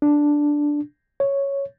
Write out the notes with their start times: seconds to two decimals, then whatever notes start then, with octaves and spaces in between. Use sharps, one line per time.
0.02 D4
1.20 C#5